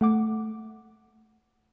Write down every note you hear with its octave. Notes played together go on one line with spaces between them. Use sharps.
A3 F#5 D6